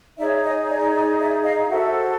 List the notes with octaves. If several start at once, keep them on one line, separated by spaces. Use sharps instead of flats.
D#4 G#4 C#5 D5 E5
C#5 D#5
D5
D5
D5 E5
D#5 F5
F#4 A4 C5 E5 F#5